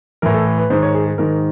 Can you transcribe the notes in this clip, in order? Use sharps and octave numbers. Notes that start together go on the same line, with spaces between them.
A2 E3 A#4
A4
B4
G#2 D#3 C5
C#5
G#4
G#4
G#2 D#3 A#4